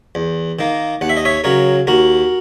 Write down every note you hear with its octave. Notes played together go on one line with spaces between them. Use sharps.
E2
D#3 A#3
D#2 F#5
E5
D#5
C#5 E5
C#3 F#3 A#4 C#5
D#2 F#4 A#4